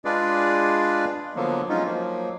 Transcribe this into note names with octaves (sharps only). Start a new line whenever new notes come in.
G#3 D4 F4 G#4 B4 D5
D3 F3 F#3 A#3 B3
F#3 G#3 C#4 D#4 F4
F3 F#3 A#3